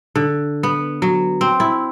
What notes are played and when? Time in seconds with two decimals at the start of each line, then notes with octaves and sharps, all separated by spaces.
0.15 D3
0.63 B3
1.02 F#3
1.41 C4
1.60 E4